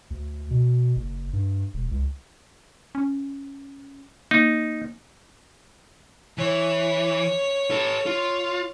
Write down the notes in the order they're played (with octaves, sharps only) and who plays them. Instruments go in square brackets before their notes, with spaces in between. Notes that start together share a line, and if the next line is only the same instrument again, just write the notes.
[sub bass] D2
B2
F#1
G2
E1
C#2
[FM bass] C#4
[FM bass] A#3 [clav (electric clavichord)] D#4
[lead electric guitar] E3 [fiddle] C#5
[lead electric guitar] A4 B4
F4